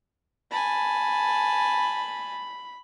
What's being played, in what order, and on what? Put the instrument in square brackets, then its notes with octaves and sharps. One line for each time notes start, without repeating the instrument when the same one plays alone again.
[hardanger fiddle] G#5 A5 [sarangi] B5